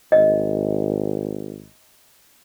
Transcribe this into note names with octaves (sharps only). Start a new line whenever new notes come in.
G#1 D#5